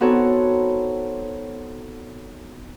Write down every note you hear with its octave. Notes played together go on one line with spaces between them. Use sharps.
B3 C4 D#4 F#4 A4 C#5